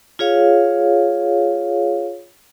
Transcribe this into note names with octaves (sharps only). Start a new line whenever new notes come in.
F4 G#4 C#5 F5